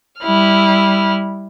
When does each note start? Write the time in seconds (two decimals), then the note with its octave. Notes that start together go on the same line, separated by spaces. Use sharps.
0.21 G3 E4 F6